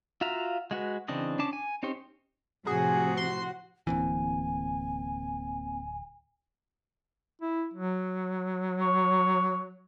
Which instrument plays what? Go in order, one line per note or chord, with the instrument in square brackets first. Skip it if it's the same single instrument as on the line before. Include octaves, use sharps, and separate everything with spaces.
[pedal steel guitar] F4 F#4 E5 F5 A#5
G#3 F#4 B4
C#3 E3 C4 D4 D#5
C#4 D4 A5 D6
G#5
C4 C#4 D#4 G4 C5
[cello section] A2 C3 F3 [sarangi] F#4 [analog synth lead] G#4
[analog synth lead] C6
[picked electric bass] D1 G1 E3 [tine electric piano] A#3 C4 [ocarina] G#5
[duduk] E4
F#3
[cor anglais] C#5